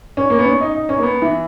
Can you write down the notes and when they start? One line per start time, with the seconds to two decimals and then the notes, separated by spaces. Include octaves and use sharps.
0.17 C#4
0.30 A#3
0.39 B3
0.45 C#4
0.61 D#4
0.75 D#4
0.89 C#4
0.98 A#3
1.03 B3
1.22 E3